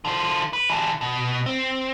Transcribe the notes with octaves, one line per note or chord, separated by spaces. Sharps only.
D3 C5
B4
D3 E3
B2
C4